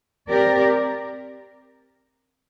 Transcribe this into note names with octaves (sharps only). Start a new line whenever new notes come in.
C4 G4 A#4 D5